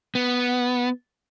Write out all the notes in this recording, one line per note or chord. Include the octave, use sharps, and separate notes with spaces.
B3